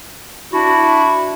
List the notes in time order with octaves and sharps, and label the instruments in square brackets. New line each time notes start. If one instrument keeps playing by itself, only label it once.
[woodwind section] D4 E4 F#4